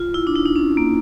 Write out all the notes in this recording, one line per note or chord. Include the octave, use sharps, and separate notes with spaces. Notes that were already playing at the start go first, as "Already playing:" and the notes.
Already playing: F4
E4
D4
D#4
D4
C#4
A#3